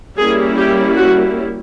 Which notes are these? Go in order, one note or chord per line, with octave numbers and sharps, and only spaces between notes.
G3 A#3 C#4 E4 G#4
G4
F#4